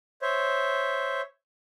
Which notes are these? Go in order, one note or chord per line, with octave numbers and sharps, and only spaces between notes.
C5 C#5 E5